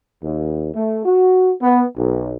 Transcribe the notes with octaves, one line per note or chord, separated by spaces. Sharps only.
D#2
A3
F#4
B3
B1